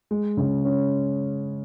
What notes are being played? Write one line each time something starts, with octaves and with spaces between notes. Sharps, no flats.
G#3
C#3
C#4